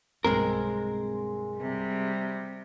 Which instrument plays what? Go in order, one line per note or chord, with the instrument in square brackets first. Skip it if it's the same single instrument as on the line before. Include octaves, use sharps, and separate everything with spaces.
[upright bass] B1 G2 [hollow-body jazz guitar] G#3 C4 A#4
[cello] C3 G3